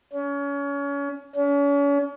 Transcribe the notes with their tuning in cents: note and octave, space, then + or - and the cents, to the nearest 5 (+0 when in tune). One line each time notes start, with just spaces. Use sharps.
C#4 +30
C#4 +40